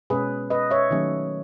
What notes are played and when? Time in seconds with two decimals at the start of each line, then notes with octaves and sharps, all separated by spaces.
0.10 B2 G#3 C#4 G#4 B4
0.50 B4 D#5
0.71 C#5 E5
0.91 D#3 F#3 A3 C#4